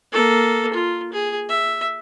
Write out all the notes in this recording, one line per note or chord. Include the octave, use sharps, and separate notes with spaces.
A#3 A4
F4
G#4
E5